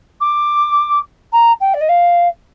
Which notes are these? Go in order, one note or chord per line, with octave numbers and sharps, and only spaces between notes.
D6
A#5
G5
D5
D#5
F5